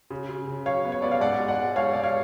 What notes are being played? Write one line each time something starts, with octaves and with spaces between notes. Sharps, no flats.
C#3
C#3
C#3
F#3 C#5 F5
B3
C#5
B3 D5
F5
G#2 D5 F#5
G#3
D5 F#5
G#3
G#2 C#5 F5
G#2 D5
C#5 F5